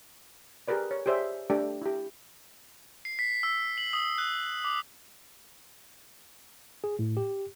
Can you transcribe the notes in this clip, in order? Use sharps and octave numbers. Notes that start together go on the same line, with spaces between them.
G4 G#4 A#4 B4 D5
C#5
G4 G#4 C5 D5 E5
A3 D4 G4 A4 D5 G5
E4 G4
C7
B6
E6
F#7
D#6
F#6
D6
G#4
A2
G4